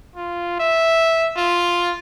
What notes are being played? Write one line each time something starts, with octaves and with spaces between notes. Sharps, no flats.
F4
E5
F4